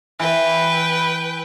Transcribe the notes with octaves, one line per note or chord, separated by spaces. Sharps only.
E3 B4 G5